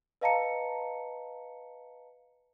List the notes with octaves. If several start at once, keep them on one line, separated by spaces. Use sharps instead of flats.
B4 D#5 F5 A5 A#5 C#7